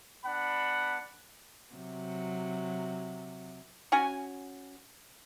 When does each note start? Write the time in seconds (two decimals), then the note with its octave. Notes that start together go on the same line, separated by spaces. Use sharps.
0.25 B3 D4 F#5 B5
1.73 C3 F#3
3.92 C#4 F#4 G#5